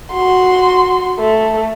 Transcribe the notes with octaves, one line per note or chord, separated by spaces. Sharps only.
F#4 C6
A3